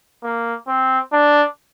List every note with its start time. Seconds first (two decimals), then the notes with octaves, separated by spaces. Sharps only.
0.24 A#3
0.68 C4
1.13 D4